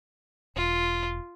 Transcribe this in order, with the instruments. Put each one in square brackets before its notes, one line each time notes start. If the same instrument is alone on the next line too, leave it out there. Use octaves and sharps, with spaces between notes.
[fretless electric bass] E1 [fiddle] F4